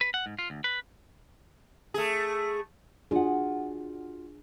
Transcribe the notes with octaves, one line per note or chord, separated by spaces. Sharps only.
B4
F#5
G#2
F4
D2
B4
A3 G#4
D4 F4 F#4 G#4 F#5